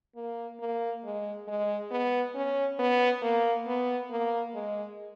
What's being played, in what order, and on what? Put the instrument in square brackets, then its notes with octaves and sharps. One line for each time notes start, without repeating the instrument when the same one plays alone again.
[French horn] A#3
A#3
G#3
G#3
B3
C#4
B3
A#3
B3
A#3
G#3